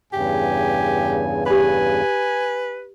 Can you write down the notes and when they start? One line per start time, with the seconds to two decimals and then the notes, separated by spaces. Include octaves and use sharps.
0.13 E2 G2 C#3 G4 G#5
1.46 G4 B4 G#5 B5